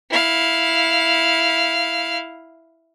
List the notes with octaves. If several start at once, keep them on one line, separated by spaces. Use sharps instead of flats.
E4 F5